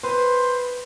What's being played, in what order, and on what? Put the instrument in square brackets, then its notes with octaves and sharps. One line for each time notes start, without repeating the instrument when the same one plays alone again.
[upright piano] B4 [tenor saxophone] C5